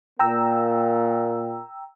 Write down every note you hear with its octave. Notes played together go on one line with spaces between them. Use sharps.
A#2 A#3 G5 A#5 E6